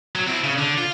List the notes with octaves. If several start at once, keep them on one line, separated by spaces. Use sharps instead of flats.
F#3
C4 E4
C#3
D3
F4